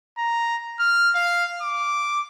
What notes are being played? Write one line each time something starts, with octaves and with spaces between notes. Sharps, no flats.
A#5
F6
F5
D6